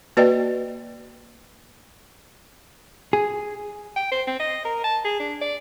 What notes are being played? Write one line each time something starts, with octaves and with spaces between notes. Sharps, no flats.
A#3 F#4 B4 D5 D#5 G5
G#4
G5
C5
C4
D#5
A#4
A5
G#4
D4
D5